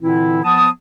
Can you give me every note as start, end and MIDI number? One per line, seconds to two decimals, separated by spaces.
0.01 0.40 46
0.01 0.40 50
0.01 0.40 52
0.01 0.40 60
0.01 0.40 64
0.43 0.68 53
0.43 0.68 59
0.43 0.68 81
0.43 0.68 87